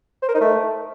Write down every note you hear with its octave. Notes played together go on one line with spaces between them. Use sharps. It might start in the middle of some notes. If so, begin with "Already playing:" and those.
C5
A#4
D#4
A3